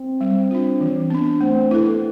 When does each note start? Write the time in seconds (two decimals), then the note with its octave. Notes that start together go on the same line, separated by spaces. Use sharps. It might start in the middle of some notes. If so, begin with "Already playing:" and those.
Already playing: C4
0.21 G3
0.51 D4 F4
0.81 E3
1.10 B3 D4
1.41 A3 C4
1.71 B3 E4 A4